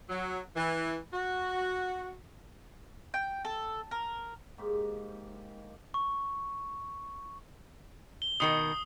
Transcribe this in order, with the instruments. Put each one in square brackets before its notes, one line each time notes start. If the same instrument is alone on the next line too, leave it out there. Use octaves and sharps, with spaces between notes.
[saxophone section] F#3
E3
F#4
[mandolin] G5
A4
A#4
[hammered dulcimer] G#2 A#3 G4
[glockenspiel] C#6
[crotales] G7
[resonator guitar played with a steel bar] B2 D#3 A#4 [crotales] D#6 C7